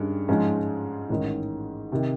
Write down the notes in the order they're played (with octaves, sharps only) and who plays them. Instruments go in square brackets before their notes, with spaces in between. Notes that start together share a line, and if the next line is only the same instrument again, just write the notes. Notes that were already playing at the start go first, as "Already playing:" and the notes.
Already playing: [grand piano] G2 D#3 G#3 C#4
G#2 F3 G#3 C#4 F4
A1 G#2 D#3
C3 D#3